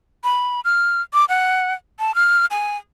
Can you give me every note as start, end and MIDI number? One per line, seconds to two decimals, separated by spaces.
0.24 0.60 83
0.65 1.02 89
1.14 1.25 86
1.29 1.74 78
1.99 2.15 81
2.15 2.46 89
2.51 2.77 80